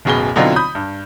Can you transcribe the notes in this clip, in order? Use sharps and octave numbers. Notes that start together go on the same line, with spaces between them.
D1 F#2 B2 G#4 B5 G7
B2 D3 F#3 C4 D#4 F4
B5 D#6 G6
G2